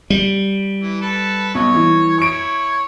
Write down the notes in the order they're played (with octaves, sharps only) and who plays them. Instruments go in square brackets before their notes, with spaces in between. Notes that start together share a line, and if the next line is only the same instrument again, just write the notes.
[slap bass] G3
[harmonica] E3
A4 B4 A5
[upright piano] B1 [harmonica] C#5
[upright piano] E3
[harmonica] E4 C#5 [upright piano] C#6 D7